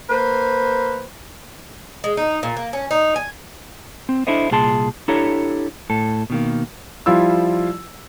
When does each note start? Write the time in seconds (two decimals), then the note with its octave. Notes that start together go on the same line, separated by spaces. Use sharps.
0.10 A#3 B4 C5
2.04 G#3
2.17 D#4
2.43 A#2
2.57 A#3
2.73 C#4
2.91 D#4
3.16 G#5
4.09 C4
4.27 D4 E4 A4 C5 D#5
4.51 C2 A#2 G#4 A5 C6
5.08 D4 E4 G4 A4 C#5 A#5
5.90 A2 A4
6.30 B2 D#3 A#3
7.06 F3 G3 E4 F4 E6